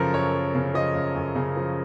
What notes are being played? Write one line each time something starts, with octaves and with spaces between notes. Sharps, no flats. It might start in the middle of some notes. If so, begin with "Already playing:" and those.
Already playing: F#2 C#3 F3 A4 A#4
F#2 C#5
F#2
C#3
F3 D#5
F#2
F#2
C#3
F3